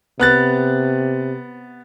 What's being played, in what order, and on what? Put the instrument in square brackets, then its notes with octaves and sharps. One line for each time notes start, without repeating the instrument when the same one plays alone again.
[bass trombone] C3 [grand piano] B3 F#6 A6